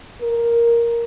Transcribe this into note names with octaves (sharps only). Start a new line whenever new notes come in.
A#4